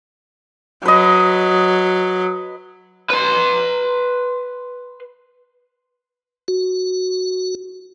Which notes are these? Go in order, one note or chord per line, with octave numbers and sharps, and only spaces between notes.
F#3 B4 D#5
B4 C6
F#4